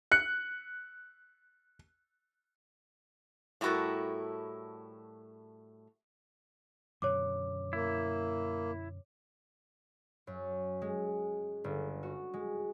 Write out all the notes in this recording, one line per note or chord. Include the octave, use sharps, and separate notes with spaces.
F#6 C#7
A2 G3 E4 F#4 A4 A#4
F#2 B2 D3 C#5 D6
A#3 E4
F#2
G#3
G1
F#4
G#3